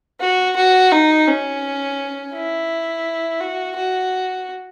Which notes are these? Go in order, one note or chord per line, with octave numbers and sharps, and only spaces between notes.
F#4
F#4
D#4
C#4
E4
F#4
F#4